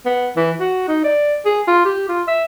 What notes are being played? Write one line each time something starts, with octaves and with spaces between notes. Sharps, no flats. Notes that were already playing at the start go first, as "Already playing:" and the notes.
B3
E3
F#4
D#4
D5
G#4
F4
G4
F4
E5